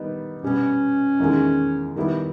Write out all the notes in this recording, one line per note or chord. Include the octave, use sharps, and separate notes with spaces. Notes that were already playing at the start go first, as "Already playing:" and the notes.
Already playing: D#3 G3 B3 D#4
B2 G3 B3 C#4
E2 D#3 G#3
D#3 G3 B3 E4